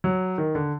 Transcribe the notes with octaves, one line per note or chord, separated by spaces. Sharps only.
F#3
D#3
D3